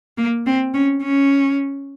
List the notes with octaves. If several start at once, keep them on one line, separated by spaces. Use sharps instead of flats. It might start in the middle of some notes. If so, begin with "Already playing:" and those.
A#3
C4
C#4
C#4